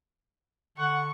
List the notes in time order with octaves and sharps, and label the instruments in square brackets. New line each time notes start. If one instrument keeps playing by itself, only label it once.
[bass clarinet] D3 [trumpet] F#5 [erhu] C#6